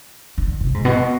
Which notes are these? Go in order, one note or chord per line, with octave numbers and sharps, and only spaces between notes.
D3
C3
G#2
B2